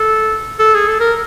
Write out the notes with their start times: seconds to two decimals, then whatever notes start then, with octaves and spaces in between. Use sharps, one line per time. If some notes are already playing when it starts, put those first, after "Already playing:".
Already playing: A4
0.59 A4
0.75 G#4
0.88 A4
1.00 A#4